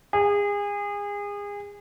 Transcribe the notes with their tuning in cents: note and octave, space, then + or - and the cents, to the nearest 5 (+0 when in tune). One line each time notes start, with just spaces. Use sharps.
G#4 -30